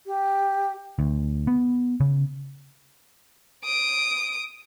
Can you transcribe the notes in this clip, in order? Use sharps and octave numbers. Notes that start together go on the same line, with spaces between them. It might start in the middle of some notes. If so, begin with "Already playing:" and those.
G4
D2
B3
C#3
D#6 D7